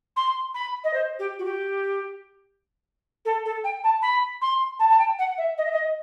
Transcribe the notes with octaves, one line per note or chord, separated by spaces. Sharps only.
C6
B5
D#5
C5
G4
F#4
G4
A4
A4
G5
A5
B5
C6
A5
A5
G5
F#5
E5
D#5
E5
D#5